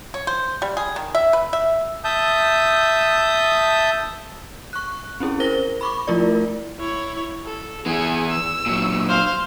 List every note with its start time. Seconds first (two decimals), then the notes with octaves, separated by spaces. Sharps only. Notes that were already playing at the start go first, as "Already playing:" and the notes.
0.14 C#5
0.27 C5
0.62 G3
0.77 G#4
0.96 D#3
1.15 E5
1.33 B4
1.53 E5
2.04 E5 A5 D#6 G6
4.73 C#6 F#6
5.20 C4 C#4 E4 G#4
5.40 A#4 C5 A#6 G7
5.81 B5 C#6 D6
6.08 F3 A3 E4 F4 A#4 D5
6.79 E4 C#5
7.46 A4
7.86 E3 B3 G#4 E5
8.30 E6
8.66 A#2 F#3
9.09 C5 F5